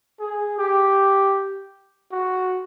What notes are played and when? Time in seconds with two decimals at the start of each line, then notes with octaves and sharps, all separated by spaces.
0.20 G#4
0.58 G4
2.11 F#4